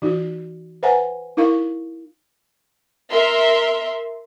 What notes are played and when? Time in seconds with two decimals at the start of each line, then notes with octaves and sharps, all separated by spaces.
0.02 E3 D#4 F#4
0.83 B4 C5 E5 F#5 G#5 A#5
1.37 D#4 E4 A#4 F5 C#6
3.11 A#4 E5 C6